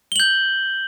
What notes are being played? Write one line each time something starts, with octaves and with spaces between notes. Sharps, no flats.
G6 F#7 G7